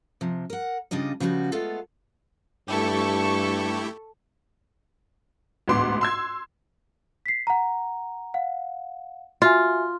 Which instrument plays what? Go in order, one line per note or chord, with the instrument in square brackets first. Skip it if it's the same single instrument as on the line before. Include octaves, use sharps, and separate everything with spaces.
[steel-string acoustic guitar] C3 F3
A#4 F#5
C#3 G3 D4 F4 D#5
C#3 F3 G3 B3 F#4
G#3 A3 B3 F4 A4 F5
[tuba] G2 [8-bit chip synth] A3 E4 G4 [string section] A4 C#6
[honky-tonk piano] A1 D2 G#2 B3 C6 D6
C6 E6 G#6
[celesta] B6 C7
F#5 A#5
F5 F#5
[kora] F4 [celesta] F#4 E5 G#5